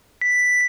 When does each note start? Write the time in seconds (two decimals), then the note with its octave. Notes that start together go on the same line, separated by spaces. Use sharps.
0.21 B6